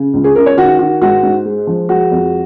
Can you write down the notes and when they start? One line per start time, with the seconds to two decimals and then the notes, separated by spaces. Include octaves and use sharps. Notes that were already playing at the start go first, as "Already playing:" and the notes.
Already playing: C#3
0.14 C#2
0.24 G#4
0.35 C#3 A#4
0.46 C#5
0.57 D#3 F#4
0.79 D#3 F#4
1.01 G#2 F#4
1.23 G#2
1.45 G#3
1.67 F3
1.89 G#3 F#4
2.11 F2